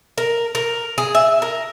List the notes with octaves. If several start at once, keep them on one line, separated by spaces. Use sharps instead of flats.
A#4
A#4
G#4
E5
A#4